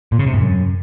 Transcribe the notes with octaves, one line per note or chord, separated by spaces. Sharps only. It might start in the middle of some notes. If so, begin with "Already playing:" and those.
A#2
C#3
C3
G#2
F#2